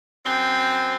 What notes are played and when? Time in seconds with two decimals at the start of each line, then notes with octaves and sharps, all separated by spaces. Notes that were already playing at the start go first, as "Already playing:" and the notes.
0.24 F#2 C4